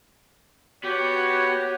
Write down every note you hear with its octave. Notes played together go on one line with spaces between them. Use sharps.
B3 F#4 G4 C#5